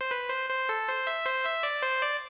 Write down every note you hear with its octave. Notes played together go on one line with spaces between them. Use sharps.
C5
B4
C5
C5
A4
C5
E5
C5
E5
D5
C5
D5